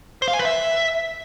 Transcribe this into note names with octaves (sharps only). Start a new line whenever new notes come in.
C5
F5
G#5
B4
E5